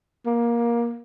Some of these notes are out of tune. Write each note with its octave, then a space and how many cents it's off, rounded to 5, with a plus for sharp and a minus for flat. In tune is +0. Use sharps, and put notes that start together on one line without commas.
A#3 +15